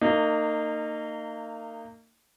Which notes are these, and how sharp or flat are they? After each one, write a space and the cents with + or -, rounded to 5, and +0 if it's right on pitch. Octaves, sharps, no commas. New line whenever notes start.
A#3 -35 D#4 -20